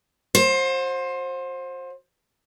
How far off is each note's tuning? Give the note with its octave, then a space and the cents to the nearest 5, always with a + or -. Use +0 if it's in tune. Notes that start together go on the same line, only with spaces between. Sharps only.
F#4 -40 C5 +20